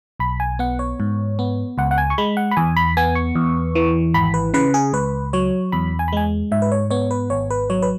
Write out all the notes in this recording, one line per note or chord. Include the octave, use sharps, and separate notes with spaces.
B1 B5
G#5
B3 F#5
C#5
G#2
B3
C#2 F#5
F#5
G#5
C#6
G#3 B5
F#5
B5
E2 G#5
B5
B3 G#5
C#6
E2
E3
G#1 B5
B4
C#3 B4
G#4
C#2 B4
F#3 C#5
E2 B5
G#5
B5
G#3 G#5
G#2 E5
B4
C#5
B3 C#5
B4
G#1 C#5
B4
F#3 C#5
B4